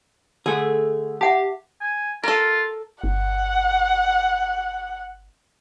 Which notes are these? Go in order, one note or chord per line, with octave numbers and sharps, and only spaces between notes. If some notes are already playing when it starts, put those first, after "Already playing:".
D3 A3 G#4
G4 E5 F#5 A5
G#5
F4 A4 A#4
G1 F#5